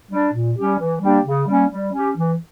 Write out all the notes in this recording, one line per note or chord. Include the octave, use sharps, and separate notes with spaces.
G3 D4
A#2
G3 C#4 G4
E3
G3 A#3 D4 G4
C#3
G3 A#3 C#4
G3
C#4 G4
E3